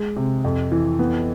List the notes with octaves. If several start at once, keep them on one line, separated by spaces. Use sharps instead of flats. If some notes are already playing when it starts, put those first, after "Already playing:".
Already playing: G#3
C3
F2
E3
B3